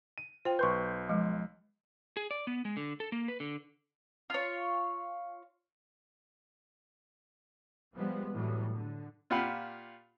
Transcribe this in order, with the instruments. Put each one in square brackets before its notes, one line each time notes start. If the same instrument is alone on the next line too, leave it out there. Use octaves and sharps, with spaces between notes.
[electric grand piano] D#7
[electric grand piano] F4 [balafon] C5 G5
[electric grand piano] B1 C6 G6 [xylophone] B4 C#6
[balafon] F3 G#3
[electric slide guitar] G#4
D5
B3
G#3
D3
A4
A#3
B4
D3
[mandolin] F4 C#5
[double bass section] F3 G3 G#3 B3
A2 E3 F#3 G3
D3
[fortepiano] A#2 F4 G4 F#5 B5